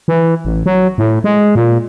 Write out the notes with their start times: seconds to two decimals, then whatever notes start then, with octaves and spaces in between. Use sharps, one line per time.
0.08 E3
0.45 A1
0.66 F#3
0.98 A2
1.24 G#3
1.55 A#2